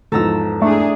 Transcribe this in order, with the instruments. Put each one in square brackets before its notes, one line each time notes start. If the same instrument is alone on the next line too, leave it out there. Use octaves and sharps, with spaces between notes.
[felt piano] E2 G#2 F3 [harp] A4 A#5 E6
[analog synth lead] A3 [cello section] D4 G#4